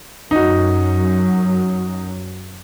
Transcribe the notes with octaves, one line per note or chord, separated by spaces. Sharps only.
F#2 F#3 D#4 F#4